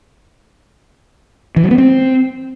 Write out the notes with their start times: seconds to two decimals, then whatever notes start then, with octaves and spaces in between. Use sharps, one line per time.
1.56 E3
1.64 F#3
1.71 B3
1.78 C4